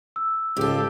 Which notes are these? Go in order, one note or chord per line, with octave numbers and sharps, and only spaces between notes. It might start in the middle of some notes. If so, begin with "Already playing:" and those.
E6
C#2 G#2 F4 G4 A4